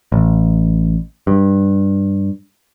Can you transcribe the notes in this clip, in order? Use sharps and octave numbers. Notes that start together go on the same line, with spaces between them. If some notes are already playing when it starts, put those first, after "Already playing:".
A1
G2